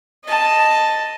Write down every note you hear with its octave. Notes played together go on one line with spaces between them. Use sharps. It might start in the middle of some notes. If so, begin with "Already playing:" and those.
D#5 A5